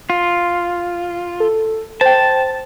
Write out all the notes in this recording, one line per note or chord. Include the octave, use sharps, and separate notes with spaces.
F4
A4
C5 G5 A5